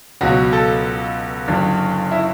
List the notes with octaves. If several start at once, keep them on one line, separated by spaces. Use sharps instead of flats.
C#2 B2 F#3 F#4
A4
F#1 F#2 D3
E4